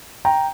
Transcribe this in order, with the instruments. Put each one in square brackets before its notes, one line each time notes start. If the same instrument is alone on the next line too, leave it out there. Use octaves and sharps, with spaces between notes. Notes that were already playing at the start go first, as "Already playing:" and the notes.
[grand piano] G5 A#5